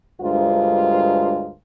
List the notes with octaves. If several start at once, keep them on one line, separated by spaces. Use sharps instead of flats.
D2 G2 G#3 F4 A#4 C5